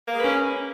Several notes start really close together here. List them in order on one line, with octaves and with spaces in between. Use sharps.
A#3 G#3 B4 C#4